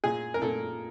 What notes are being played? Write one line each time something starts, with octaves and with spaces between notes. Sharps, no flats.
A#2 G#4
A#4
A#2 A4